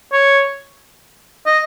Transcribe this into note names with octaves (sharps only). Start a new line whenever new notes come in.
C#5
D#5